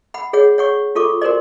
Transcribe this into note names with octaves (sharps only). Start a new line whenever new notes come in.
F#5 B5
G#4 C#5 F#5
C#5 F#5 C#6
F4 A4 C#6 D6
F#4 A#4 C5 D5